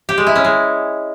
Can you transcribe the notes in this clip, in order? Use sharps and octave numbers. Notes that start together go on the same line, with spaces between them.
G4
G#3
E4
C#4
G#3